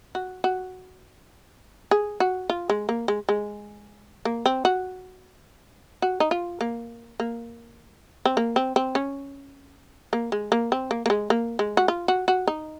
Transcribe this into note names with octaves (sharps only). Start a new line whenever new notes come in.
F#4
F#4
G#4
F#4
F4
G#3
A#3
G#3
G#3
A#3
C4
F#4
F#4
D#4
F4
A#3
A#3
C4
A#3
C4
C4
C#4
A#3
G#3
A#3
C4
A#3
A#3
G#3
A#3
G#3
F#4
F4
F#4
F#4
D#4